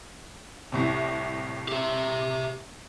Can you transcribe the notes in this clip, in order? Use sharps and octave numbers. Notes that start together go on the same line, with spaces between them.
C2 A2 C3
G4 E5